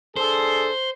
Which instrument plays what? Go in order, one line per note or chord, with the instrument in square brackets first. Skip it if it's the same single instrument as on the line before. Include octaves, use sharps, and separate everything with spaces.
[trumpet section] D4 G#4 A4 [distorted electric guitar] C5